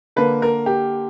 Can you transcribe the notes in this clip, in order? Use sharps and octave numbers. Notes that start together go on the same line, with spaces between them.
D3 A#3 B4
A#4
G4